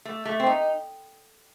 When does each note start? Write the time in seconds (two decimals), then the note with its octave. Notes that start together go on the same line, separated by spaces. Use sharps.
0.05 A3
0.25 A3
0.40 C4
0.46 D#4